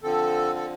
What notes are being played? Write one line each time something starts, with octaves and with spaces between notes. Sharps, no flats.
D3 F3 C4 A4
A4